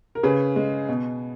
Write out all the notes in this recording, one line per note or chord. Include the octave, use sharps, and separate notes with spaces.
A#4
C#3 G#4 B4
G#3
B2